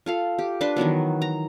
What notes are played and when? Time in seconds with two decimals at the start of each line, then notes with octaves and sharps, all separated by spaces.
0.06 F4 A4 F5
0.39 G4
0.61 D4 B4 A5 C6
0.76 D#3 E3 F#3 B3
1.22 A#5